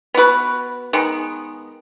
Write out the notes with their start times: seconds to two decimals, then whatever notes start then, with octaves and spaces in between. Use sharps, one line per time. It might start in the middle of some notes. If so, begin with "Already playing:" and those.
0.14 B3 F#4 B4
0.93 D#3 G#3 B3